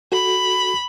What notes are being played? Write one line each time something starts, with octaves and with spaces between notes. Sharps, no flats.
F#4 A4 B5